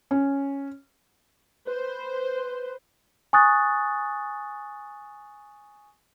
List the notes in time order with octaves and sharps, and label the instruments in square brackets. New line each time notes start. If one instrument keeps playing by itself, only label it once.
[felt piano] C#4
[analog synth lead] B4 [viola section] C5
[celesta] G#5 C#6 D#6 F#6 A6